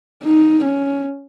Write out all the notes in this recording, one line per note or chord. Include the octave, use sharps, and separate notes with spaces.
D#4
C#4